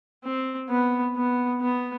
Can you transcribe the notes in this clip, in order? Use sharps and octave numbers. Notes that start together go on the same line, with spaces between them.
C4
B3
B3
B3